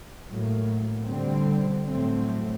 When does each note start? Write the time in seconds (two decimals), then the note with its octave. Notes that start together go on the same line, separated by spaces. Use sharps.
0.29 A2 F#3 A#3
1.06 D3 G3 C4
1.86 A2 F#3 A3 C4